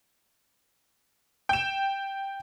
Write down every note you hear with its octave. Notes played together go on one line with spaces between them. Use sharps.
G5 E7